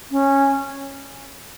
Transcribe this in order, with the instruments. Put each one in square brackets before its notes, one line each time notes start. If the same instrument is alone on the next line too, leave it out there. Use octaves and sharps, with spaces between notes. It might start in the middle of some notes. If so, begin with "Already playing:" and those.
[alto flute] C#4